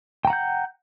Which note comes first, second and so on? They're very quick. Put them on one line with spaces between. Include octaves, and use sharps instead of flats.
G5 A#5 F#5 G6